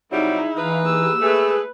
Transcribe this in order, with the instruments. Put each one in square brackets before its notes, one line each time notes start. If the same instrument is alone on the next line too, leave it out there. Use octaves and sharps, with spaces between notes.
[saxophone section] C3 F#3 G3 [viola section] D#4 G#4 [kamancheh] E4
[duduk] E3 [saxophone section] D#4 B4 [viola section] F5
[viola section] A#3 G4 G#4 [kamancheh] E6
[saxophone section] G#3 A3 [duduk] G#4 [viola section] B4